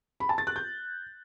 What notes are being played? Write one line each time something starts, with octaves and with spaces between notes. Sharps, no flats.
B5
A5
A6
F#6
G6